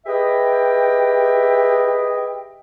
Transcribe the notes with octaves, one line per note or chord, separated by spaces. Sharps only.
G4 G#4 B4 D#5 E5 G5